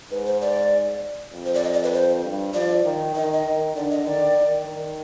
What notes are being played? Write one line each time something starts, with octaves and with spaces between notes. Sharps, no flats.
G#2 B4
C5
D5
F2
C5
D5
D#5
D5
B4
C5
G2
F3 D5
D#3
D#3 D#5
D#5
D#3
D3 D5
D#5
D#3 D5
D#3
D#3